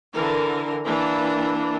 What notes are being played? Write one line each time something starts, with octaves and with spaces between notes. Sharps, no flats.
D3 E3 A#4
E3 A#3 D4